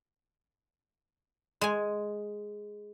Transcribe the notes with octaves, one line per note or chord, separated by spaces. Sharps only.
G#3 G#5